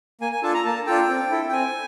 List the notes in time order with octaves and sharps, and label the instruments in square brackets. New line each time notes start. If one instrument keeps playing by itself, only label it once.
[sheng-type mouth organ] A#3 G#5
G#5
D4 F4 A4 A5
A#5
A#3 A5
D4 F4 A4 G5
C4
E4 A4
G5
C4 G#5